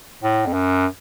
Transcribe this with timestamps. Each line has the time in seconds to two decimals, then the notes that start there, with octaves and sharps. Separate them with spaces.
0.23 A2
0.47 F2
0.54 F#2